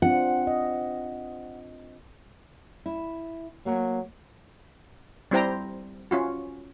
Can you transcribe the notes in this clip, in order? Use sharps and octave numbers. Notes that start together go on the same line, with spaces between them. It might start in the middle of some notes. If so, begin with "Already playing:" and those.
C4 D4 F4 F#5
D#5
E4
F#3 A#3
G3 C4 E4 C5 G5 A#5
C#4 F4 F#4